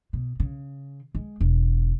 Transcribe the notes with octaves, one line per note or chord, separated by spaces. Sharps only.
B2
C#3
G#3
E1